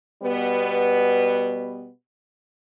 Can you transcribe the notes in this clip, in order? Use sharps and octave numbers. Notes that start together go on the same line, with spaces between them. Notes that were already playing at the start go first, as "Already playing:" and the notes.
B2 G3 B3